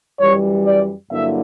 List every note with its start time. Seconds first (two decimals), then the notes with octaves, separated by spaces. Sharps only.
0.19 F#2 E3 G3 C#5
0.66 D5
1.12 G2 D3 F#3 A#3 E4 E5